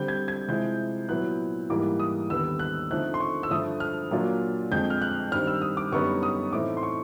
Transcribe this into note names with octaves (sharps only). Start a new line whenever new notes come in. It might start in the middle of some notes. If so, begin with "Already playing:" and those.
Already playing: D3 G3 C4 G6
G#6
G#6
C3 F3 G#3 C4 E4 G6
A#2 F#3 B3 E4 F#6
G#2 E3 G3 A#3 D6
D#6
D#2 D3 G3 B3 E6
F#6
D3 F3 A3 C4 D#4 F#6
C6
C#6
E6
G2 D3 F3 A3 D#6
F6
A#2 F#3 A#3 D4 F4
F2 D3 F3 G#3 G6
F6
F#6
G2 D#3 G3 C4 F6
E6
D#6
D6
F#2 D3 G3 B3 D#4 C#6
D#6
A2 E3 A3 C4 D#4 D6
C6
C#6